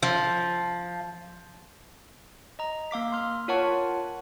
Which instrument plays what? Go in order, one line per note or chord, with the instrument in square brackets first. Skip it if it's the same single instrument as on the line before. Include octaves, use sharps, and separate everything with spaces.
[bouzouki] F3
[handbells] D#5 A#5
A#3 F5 D6 B6
C6 F6
F4 A#4 C#5 F#5 A5 C#6